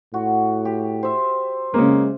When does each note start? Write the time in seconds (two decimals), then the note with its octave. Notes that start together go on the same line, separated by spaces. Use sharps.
0.14 A2 F#4
0.65 G4
1.03 C5 E5
1.74 C#3 G#3 A#3